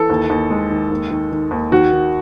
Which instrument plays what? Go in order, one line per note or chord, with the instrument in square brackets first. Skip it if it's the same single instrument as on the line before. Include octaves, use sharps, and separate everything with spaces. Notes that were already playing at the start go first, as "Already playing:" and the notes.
Already playing: [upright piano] E3 A4
D#2
D#2
G#3
D#3
D#2
D#3
D#3
D#2
D#3 F#4
D#3